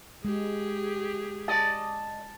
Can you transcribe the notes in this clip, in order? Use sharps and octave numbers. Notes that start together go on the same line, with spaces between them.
G#3 G4 G#4
D5 D#5 A5